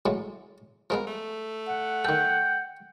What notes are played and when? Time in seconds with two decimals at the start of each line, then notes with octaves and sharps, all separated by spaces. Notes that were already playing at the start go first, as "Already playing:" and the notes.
0.06 A2 F#3 G#3
0.90 F3 G#3 B3 A#4
1.07 A3
1.66 F#5
2.05 D#3 A4 G5